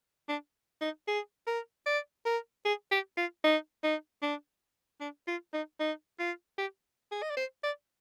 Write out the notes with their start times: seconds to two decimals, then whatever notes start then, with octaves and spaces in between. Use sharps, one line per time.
0.28 D4
0.81 D#4
1.07 G#4
1.47 A#4
1.86 D5
2.25 A#4
2.65 G#4
2.91 G4
3.17 F4
3.44 D#4
3.83 D#4
4.22 D4
5.00 D4
5.27 F4
5.53 D#4
5.80 D#4
6.19 F4
6.58 G4
7.11 G#4
7.22 D#5
7.30 D5
7.37 C5
7.63 D5